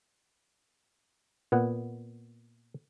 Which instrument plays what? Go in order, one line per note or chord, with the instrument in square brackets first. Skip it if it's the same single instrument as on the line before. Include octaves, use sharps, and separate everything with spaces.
[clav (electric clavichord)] A#2 B3 F#5